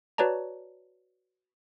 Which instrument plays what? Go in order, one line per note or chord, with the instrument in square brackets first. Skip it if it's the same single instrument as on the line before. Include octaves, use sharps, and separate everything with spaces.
[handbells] F#4 B4 C#5 D5 A5 A#5